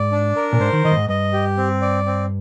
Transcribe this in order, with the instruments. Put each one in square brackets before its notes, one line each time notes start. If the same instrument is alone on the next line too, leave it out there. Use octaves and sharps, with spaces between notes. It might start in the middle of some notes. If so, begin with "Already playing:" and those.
Already playing: [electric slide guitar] G#2 [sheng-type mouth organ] D5
[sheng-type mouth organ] D4
A#4
[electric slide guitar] A#2
[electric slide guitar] G#2 [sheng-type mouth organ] C5
[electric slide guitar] D#3
[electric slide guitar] D#3 [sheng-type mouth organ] D#5
[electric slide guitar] G2
G#2
[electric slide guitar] G2 [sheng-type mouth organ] D#5
[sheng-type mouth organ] G4
C4
D5
C4